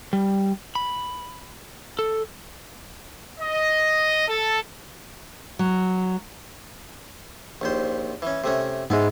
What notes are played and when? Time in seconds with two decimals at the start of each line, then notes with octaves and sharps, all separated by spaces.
0.13 G3
0.75 B5
1.99 A4
3.40 D#5
4.29 A4
5.59 F#3
7.62 A#1 D#2 C5
8.22 E3 C#4
8.44 C3 A3 C#4
8.90 G#2 G#3 B3 E4